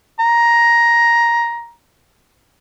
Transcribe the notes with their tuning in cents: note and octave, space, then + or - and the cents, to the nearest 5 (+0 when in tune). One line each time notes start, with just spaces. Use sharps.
A#5 +10